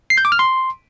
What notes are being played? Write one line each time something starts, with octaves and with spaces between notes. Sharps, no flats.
C7
G6
D6
F6
C6